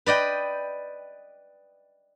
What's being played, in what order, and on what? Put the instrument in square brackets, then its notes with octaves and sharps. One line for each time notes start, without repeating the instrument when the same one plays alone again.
[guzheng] B4 D5 D#5 G5